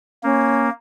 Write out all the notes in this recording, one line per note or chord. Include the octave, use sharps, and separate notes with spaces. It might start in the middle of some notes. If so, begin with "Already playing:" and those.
A#3 C#4